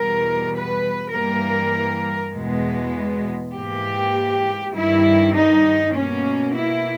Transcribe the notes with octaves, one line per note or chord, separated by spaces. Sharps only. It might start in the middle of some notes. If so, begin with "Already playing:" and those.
Already playing: E2 B2 G3 A#4
B4
G2 E3 G3 A#3 A#4
E2 B2 G#3 B3
G#2 E3 A#3 G4
G2 D#3 G3 E4
D#4
B2 A#3 C#4
E4